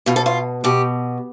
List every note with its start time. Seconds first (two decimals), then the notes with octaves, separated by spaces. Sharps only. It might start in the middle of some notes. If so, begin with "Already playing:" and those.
0.06 B2 F4
0.16 A4
0.26 F4
0.64 B2 G4